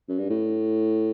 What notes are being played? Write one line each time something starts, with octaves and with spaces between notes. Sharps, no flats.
F#2
G2
A2